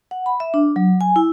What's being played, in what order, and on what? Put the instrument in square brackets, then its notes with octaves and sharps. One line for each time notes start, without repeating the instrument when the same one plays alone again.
[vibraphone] F#5
B5
E5
D4
F#3
G#5
E4